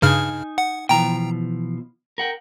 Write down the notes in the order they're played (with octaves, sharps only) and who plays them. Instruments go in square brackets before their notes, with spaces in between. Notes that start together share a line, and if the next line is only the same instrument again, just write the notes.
[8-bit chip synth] G2 C#3 F6 [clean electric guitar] D#4 G#5
[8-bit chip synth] F#5
[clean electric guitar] B2 E3 F3 [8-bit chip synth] G5 A#5
[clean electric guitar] A#4 F#5 G5